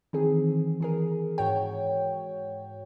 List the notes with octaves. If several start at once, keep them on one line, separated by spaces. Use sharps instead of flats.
D#3 E3 C4 G#4
E3 G#4 A#4
G#2 F#4 C#5 G5